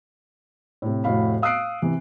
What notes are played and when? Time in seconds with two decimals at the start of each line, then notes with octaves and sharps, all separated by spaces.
0.82 A2 C3
1.04 F1 A2 F#4 F5 B5
1.42 F5 D#6 E6 F#6 C7 D7
1.82 C3 E3